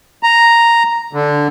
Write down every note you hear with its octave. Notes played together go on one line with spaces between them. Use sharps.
A#5
D3